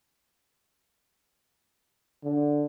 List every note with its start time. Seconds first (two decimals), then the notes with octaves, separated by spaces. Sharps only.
2.24 D3